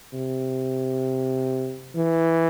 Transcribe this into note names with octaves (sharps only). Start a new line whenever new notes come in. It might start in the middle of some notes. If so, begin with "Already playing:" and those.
C3
E3